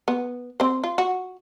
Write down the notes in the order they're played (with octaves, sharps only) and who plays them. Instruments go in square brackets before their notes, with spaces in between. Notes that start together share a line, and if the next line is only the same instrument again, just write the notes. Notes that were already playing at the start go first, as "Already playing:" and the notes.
[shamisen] B3
C4 C5
F4
F#4